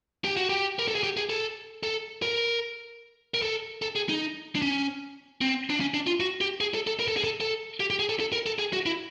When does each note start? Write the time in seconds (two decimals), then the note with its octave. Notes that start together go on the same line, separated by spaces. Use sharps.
0.24 G4
0.37 F#4
0.49 G4
0.79 A#4
0.88 A4
0.95 G#4
1.03 G4
1.17 G#4
1.29 A4
1.83 A4
2.22 A#4
3.34 A#4
3.42 A4
3.82 A4
3.96 G#4
4.09 D#4
4.55 D4
4.62 C#4
5.41 C4
5.70 D4
5.80 C#4
5.94 D4
6.07 F4
6.20 F#4
6.41 G4
6.60 G#4
6.74 A4
6.87 A4
6.99 A#4
7.08 A4
7.17 G#4
7.24 A4
7.40 A4
7.80 G4
7.90 G4
7.99 G#4
8.09 A4
8.20 A4
8.33 A#4
8.46 A4
8.59 G#4
8.73 F#4
8.86 E4